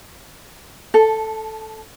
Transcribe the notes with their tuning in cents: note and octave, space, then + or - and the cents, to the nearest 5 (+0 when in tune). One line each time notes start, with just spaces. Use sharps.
A4 +0 A5 -25